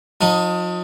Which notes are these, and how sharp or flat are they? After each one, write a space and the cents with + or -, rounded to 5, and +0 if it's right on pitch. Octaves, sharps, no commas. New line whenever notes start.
F3 +40 D#4 +0